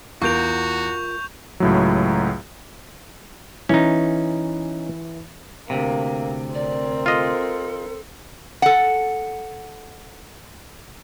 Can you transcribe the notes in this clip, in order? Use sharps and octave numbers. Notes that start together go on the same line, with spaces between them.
E2 F4 F#4 A#4 C#6 G6 D7 F7
C#2 A2 F#3
E3 C#4 D#4
D2 G#2 C3 A#3
C4 A#4 D5
F4 A4 D#5
A4 F#5